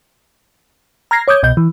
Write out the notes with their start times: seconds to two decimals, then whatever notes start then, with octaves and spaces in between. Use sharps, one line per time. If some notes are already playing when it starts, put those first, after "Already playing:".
1.11 A#5 F6 G#6 A#6 C7
1.28 C#5 D6 D#6 G6 G#6
1.43 C2 B2 D#5 G6
1.57 E3